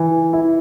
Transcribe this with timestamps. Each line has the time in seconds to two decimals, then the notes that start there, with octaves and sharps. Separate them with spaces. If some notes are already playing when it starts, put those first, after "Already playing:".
Already playing: E3
0.33 E4